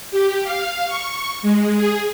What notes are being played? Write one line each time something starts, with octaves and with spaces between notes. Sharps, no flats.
G4
F5
C#6
G#3
G#4